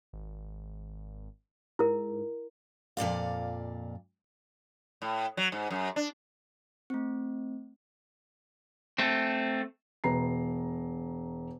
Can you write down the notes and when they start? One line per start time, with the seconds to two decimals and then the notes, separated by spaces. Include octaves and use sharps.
0.13 G#1
1.79 G#2 E4 A#4
2.97 F2 A#2 D5 F5
5.02 A2
5.37 F#3
5.52 G#2
5.71 F#2
5.96 D4
6.90 A3 C4
8.98 A3 C4
10.04 E1 B4 A#5 C7